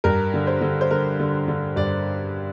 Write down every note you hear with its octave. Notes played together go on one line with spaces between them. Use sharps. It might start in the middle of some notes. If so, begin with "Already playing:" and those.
G2 A#4
D3
C5
D3
C5
D3 A#4
D3
D3
G2 D5